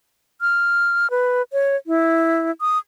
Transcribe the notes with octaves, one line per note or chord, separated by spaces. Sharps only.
F6
B4
C#5
E4
D#6